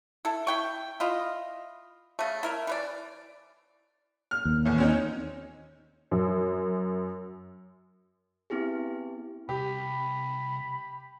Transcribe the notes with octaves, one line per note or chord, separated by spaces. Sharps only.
E4 A4
E4 G5 C#6
E4 F4 D#5
C#3 A3
E4 A#4 E5
E3 B4 D5
F6
D#2
E2 A2
C4 C#4 D#4
F#2
B3 C4 E4 G4 G#4
C2 G4 B5